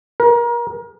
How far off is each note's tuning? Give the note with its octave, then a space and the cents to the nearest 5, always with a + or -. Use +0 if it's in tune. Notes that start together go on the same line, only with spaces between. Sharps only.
A#4 +30